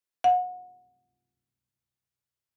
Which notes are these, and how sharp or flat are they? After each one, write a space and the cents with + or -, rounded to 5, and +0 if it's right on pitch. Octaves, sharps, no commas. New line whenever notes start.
F#5 -30